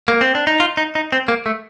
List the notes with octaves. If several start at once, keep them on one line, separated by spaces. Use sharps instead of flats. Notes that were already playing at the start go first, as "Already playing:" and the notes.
A#3
C4
D4
D#4
F4
D#4
D#4
C4
A#3
A3